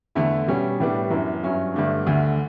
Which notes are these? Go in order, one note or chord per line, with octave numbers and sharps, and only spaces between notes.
E2 D3 A3 E4
B2 G3 C#4
A2 G3 B3 D4
F#2 E3 B3 D4
G2 F#3 C#4 E4
G2 D3 A3 D4
D2 D3 A3